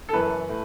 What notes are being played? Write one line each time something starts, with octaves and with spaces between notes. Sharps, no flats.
A4
F#2 E3 B4
A2